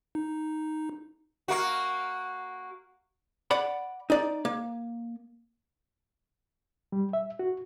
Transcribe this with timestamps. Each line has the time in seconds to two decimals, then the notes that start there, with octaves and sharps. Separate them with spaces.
0.15 D#4
1.48 A#3 F#4
3.51 D5 F#5 B5
4.10 D#4 D5
4.45 A#3
6.92 G3
7.13 E5
7.39 F#4